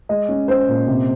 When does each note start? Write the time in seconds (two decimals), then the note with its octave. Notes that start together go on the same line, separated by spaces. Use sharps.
0.09 G#3 D#5
0.29 C#4
0.48 C#4 C5
0.68 A#2
0.88 C3